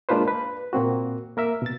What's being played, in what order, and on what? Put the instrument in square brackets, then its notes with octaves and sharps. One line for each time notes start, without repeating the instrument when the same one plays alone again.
[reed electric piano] G#3 A#3 D4 F4 B4 C5
B4
A#2 A#3 C4 F#4
A#3 A#4 E5
B2 A6